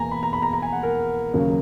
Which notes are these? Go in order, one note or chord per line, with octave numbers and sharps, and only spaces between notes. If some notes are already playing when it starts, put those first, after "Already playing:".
Already playing: E2 B2 A#3 G#5 A#5
B5
A#5
B5
A#5
A#5
G#5
F#5
A#4
D#2 C#3 F#3 A#3